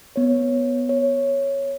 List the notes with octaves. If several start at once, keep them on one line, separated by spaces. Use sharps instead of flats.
B3 C#5
C#5